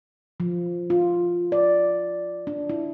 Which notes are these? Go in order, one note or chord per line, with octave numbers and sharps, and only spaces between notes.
F3
F4
D5
D4
E4